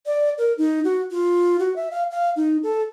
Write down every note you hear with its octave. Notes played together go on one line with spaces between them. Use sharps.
D5
A#4
D#4
F#4
F4
F#4
E5
F5
F5
D#4
A4